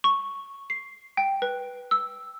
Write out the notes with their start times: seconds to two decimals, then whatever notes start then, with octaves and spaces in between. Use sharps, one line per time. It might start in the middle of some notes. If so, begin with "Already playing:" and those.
0.04 C#6
0.70 C7
1.17 G5
1.42 B4
1.91 E6